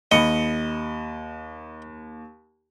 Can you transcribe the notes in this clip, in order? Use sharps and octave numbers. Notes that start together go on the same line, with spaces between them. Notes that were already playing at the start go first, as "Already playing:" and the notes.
D#2 D#5 B5 C#7